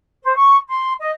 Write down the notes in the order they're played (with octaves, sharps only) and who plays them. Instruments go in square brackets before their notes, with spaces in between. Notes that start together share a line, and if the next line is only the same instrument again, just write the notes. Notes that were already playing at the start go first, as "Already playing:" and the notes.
[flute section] C5
C#6
C6
D#5